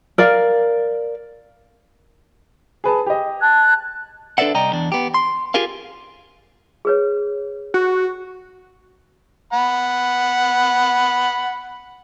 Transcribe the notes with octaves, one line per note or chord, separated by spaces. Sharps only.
A#4 D5 F5
G#4 B4 A5
G4 D#5
A5 F#6 G#6
D4 A4 B4 D5 E5 F#5
C2 D5 D#5 G5 A#5
E2 D4
B3 G4
C6
F4 G4 G#4 A#4 F5
G#4 B4 C#5
F#4
F#5 B5